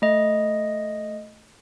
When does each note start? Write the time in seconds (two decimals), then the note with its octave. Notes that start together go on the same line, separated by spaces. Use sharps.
0.02 A3 D#5